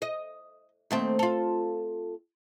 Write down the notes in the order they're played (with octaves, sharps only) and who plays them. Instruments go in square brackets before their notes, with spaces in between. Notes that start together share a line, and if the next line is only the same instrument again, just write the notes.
[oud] D#5
D#2 A3 C4
F4 A4